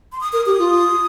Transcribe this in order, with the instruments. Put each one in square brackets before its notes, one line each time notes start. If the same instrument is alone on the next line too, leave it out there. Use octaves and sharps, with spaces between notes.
[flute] C6
D#6
[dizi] A#4 [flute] D#6
[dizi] G4 [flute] D#6
[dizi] F4